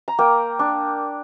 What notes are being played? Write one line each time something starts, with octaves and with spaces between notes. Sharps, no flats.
A#5
A#3 G5
D4